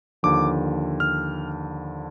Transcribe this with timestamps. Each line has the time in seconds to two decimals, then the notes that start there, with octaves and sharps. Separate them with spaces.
0.23 D#2 D3 F3 D6
1.00 F6